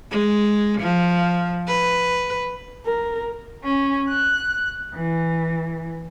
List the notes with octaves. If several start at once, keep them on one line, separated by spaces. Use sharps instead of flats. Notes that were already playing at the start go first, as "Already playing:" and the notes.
G#3
F3
B4
A#4
C#4
F#6
E3